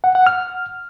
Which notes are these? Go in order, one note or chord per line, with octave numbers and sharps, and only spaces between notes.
F#5
F#5
F6